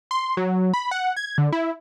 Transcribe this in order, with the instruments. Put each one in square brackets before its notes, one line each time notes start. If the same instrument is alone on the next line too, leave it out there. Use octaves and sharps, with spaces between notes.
[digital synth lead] C6
F#3
B5
F#5
G#6
D3
E4